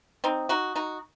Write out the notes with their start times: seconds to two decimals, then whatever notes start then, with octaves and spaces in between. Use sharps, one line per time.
0.24 C4 D#4
0.49 D#4 F#4
0.75 D#4 F#4